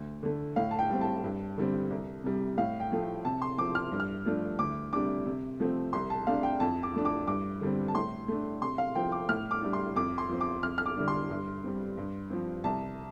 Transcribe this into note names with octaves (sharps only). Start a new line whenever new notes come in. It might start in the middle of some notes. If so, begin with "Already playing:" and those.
Already playing: D2
D3 A3
A2 F5
A5
G5
G3 C4
A5
G2
D3 G3 C4
C2
C3 G3
A2 F5
G5
F3 A3
C3 A5
C6
F3 C4 D6
F6
G2
F6
F3 A3 D4
D2 D6
C3 G3 D4 D6
C3
F3 A3 C4
C2 C6
A5
C3 A3 D4 F5
G5
F2 A5
D6
F3 A3 D4
D6
G2 D6
D3 G3 C4
A5
A2 C6
A3 D4
C3 C6
F5
F3 C4 G5
D6
A2 F6
D6
G3 D4
C6
F2 D6
C6
F3 C4
D6
F2 F6
F6
D6
D3 G3 D4
C6
G2
G3 C4
G2
F3 C4
C2 A5